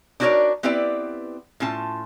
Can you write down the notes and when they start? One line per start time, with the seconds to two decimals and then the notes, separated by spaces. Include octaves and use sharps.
0.20 D4 D#4 F#4 A#4 C#5 D5
0.63 B3 C4 E4 G4 B4 D5
1.60 A2 C#4 F4 A5